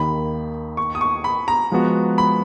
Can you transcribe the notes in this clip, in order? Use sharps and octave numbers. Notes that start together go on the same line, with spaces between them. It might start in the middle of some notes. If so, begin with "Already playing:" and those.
Already playing: D#2 D#3 A#3 D#4 B5
C#6
D#6
C#6
B5
A#5
F3 G#3 B3 F#4
B5